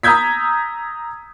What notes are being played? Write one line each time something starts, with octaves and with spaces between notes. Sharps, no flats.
A#5 D#6 E6 G6 G#6 B6